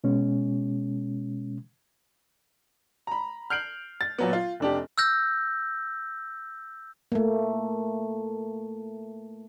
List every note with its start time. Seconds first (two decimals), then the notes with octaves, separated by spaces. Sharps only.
0.04 B2 G#3 C#4
3.07 A#5 B5
3.50 F6 G6 C7 D7 F#7
4.01 A6
4.18 A#2 F#3 B3
4.33 F4
4.60 F1 D4 G4
4.98 E6 F6 G6 A#6
7.12 A3 A#3